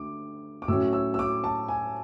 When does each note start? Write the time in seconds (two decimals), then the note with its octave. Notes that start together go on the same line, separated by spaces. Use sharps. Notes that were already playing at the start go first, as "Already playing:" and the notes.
Already playing: D3 A3 D6
0.62 D6
0.68 A2 F#3 C#4 E6
0.93 E6
1.14 E6
1.19 D6
1.44 A5
1.68 G#5